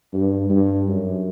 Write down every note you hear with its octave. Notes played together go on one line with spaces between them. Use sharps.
G2
G2
F#2